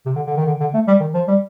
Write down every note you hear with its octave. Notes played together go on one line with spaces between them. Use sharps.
C3
D3
D3
D#3
D3
D3
A3
G3
D#3
F3
G3